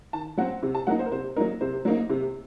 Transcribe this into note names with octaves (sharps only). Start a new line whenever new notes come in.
D#3 A5
F#3 C4 F#5
C3
A5
F#3 A#3 D#4 F#5
C5
A#4
C3 C5
F#3 A#3 D#4 A#4
C3 C5
F#3 A#3 D#4
C3